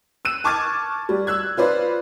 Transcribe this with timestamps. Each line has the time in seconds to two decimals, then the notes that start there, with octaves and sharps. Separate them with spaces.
0.25 E6 F#6 D#7
0.44 A5 C#6 D6 F6 G#6 A6
1.09 G3
1.27 E6 F#6 G#6
1.57 F4 B4 C5 D5